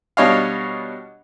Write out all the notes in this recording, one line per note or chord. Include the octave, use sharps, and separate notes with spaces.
B2 G3 D4 C#5 D#5 F5